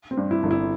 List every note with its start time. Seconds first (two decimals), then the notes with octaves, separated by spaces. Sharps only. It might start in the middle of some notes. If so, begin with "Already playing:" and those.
0.11 C4
0.17 G2
0.31 E4
0.43 G1
0.51 E4